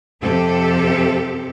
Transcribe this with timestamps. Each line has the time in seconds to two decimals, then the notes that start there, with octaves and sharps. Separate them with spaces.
0.22 F2 C3 C4 G4 A4